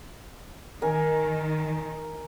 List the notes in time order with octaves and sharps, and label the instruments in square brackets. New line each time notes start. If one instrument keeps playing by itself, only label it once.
[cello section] D#3 [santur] A#4 G#5